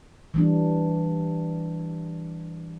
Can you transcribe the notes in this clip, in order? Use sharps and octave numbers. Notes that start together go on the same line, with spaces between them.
E3 G3 D4